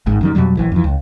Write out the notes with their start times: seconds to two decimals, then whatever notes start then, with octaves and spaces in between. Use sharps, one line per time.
0.06 G#1 G#2
0.21 F#2 D#3 G3
0.35 F2 B2 F#3 G3
0.57 A#1 E3
0.72 F2 E3
0.84 C#2